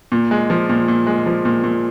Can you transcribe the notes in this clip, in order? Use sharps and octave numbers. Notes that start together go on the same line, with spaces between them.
A#2
G#3
F3
A#2
A#2
G#3
F3
A#2
A#2